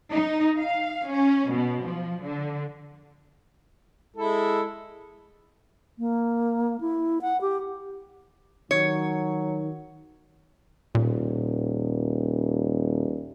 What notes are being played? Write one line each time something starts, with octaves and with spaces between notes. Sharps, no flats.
D#4
F5
C#4
B2
F3
D3
G#3 E4 A4
A#3
E4
F#5
G4
D#3 F#3 C#5
D#1 A#2